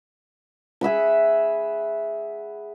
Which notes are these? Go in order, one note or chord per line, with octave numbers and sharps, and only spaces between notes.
G#4 E5 F#5 B5